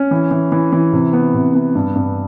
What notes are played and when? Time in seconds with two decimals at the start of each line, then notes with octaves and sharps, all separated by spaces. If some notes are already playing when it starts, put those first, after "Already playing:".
Already playing: C#4
0.11 E3
0.31 E3
0.52 E3
0.72 E3
0.93 C3
1.13 B3
1.34 C3
1.54 B3
1.75 G2
1.95 G2